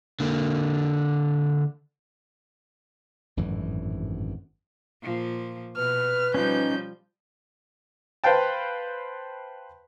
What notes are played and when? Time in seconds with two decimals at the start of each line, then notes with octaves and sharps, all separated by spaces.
0.20 D3 A#3
3.37 G#1 F#2 A2 E3
5.03 A#2 F3
5.77 B2 B4 F6
6.34 F3 G3 C#4 D#4 G6
8.24 B4 C5 F5 G5 A5